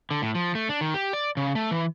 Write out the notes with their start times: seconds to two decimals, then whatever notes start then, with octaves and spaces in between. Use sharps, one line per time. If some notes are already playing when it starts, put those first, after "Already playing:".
0.11 D3
0.22 A2
0.35 F3
0.55 A3
0.69 D4
0.81 D#3
0.94 G4
1.13 D5
1.37 C#3
1.55 A3
1.71 E3